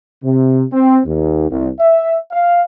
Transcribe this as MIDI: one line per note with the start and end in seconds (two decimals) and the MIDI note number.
0.23 0.63 48
0.72 1.00 60
1.05 1.48 39
1.50 1.68 36
1.80 2.17 76
2.31 2.62 77